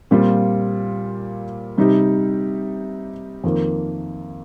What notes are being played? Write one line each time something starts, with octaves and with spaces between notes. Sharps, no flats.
A#2 G3 C4 F4
C3 G3 D#4 G4
F2 D#3 A#3